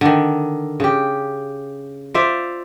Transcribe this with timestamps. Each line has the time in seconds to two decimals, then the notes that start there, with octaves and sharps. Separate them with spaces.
0.01 D3 D#3
0.80 C#3 G4
2.14 F4 C5 D5 E5